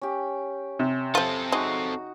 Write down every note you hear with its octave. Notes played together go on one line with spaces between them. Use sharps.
C#4 G4
C3
F3 C4 F4 A4
G#3 D#4 F#4